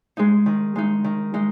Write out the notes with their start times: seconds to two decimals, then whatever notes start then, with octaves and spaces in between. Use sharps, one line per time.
0.17 G#3 D#4
0.46 D#3
0.76 G#3 D#4
1.04 D#3
1.34 G#3 D#4